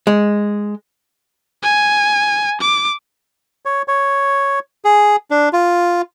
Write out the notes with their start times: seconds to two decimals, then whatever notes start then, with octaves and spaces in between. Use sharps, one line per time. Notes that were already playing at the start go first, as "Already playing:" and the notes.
0.07 G#3
1.63 G#5
2.61 D6
3.65 C#5
3.88 C#5
4.85 G#4
5.31 D4
5.53 F4